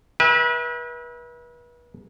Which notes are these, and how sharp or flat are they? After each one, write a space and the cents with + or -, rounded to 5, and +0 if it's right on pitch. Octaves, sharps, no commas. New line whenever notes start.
B4 -35 E5 -20 G5 +45